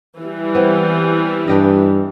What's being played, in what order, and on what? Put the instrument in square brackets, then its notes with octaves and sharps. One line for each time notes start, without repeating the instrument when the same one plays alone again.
[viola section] E3 G3
[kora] B3 C4
[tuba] G2 [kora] D4 G4 D#5